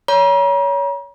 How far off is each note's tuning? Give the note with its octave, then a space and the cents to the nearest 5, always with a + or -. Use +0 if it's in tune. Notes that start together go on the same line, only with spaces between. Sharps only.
C#5 +25 A#5 +45